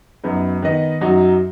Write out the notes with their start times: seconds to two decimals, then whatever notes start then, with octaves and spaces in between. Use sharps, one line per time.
0.24 F#2 F#3 B3 D#4
0.62 D#3 B3 D#4 B4 D#5
1.01 F#2 F#3 D#4 F#4